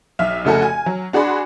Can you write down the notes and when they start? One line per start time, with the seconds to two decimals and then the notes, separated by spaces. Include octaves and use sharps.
0.19 B1 E5 F6
0.45 F1 C#3 A3 F#4 A4 G#5
0.62 G#5
0.86 F#3
1.13 D4 F#4 G#4 D5 B5 C6